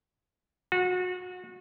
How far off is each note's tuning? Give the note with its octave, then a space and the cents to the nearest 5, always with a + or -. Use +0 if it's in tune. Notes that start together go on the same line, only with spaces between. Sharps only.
F#4 -30